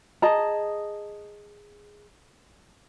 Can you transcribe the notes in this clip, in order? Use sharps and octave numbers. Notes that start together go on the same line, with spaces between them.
G#4 D#5 A5 A#5